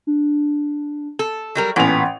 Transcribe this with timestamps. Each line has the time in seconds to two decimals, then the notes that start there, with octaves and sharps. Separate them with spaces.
0.07 D4
1.19 A4
1.55 F#3 G3 A#4 C#6
1.76 A1 A#2 B3 G5 G#5 F7